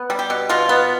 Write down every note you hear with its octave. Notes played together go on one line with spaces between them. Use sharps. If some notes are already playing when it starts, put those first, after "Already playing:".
Already playing: B3
G3
G4
B2
B2 F4
B3